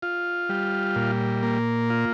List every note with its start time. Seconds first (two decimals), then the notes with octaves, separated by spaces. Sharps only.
0.02 F4
0.49 G3
0.96 A#2
1.43 A#3
1.90 F4